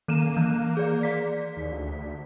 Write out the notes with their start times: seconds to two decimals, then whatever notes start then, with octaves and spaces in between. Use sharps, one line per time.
0.08 D#3 A#3 D#7 E7
0.37 E3
0.77 G#4 D5
1.03 D5 B6
1.57 D#2
1.72 D2